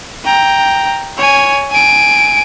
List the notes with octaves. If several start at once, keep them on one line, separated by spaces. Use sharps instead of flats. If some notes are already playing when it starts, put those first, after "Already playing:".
G5 A#5
C#5 G#5
G#5 D7